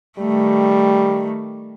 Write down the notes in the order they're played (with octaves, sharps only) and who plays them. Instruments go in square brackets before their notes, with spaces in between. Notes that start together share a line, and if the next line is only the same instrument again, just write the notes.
[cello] D#3 A3 [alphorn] G3